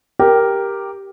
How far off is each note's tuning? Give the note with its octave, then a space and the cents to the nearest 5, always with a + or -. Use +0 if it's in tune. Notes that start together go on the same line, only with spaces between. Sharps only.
G4 +0 A#4 +0